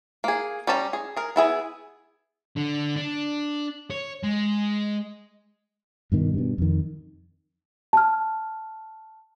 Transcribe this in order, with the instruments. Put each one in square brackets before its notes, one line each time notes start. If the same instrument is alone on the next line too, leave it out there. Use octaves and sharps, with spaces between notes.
[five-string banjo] A#3 G#4
G3 C#4 A5 A#5
G#4
G#4 A#4
B3 E4 G#4
[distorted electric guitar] D3
D4
C#5
G#3
[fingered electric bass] G2 B2 D#3
G2 B2
F2 D#3
[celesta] A5 F6